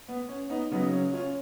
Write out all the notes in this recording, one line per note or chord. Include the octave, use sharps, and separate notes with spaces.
B3
C#4
B3 D#4
C#3 F#3 B3 D#4
C#4
C#4 F4